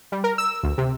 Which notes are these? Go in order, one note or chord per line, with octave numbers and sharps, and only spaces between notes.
G3
A#4
E6
D2
C3